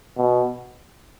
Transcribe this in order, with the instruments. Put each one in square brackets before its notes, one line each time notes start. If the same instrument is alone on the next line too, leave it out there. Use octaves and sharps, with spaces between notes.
[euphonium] B2